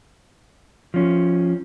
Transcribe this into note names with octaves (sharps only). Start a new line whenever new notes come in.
F3 C#4